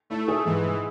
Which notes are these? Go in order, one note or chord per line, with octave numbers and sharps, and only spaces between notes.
A3 E4
G#4
G#2 E3
G#2